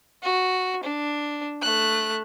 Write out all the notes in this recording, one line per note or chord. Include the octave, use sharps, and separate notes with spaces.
F#4
D4
A3 F#6